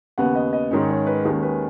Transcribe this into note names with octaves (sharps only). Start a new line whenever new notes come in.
D#2 C#3 B3 F#5
D#5
D#5
G#2 D#3 G#3 C#4 C#5
C#5
B4
D#2 D#3 G#3 C#4 G#4
B4